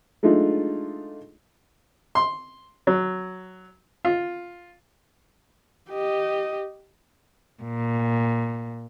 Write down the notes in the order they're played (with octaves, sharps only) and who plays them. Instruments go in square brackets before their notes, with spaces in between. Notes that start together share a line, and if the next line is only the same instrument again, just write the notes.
[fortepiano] G#3 A3 D4 D#4 F4
C6
F#3
F4
[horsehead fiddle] G4 D#5
[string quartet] A#2